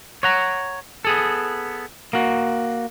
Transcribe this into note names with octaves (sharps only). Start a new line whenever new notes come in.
C#5 F#5 A#5
B3 G#4 A4
A#3 F#4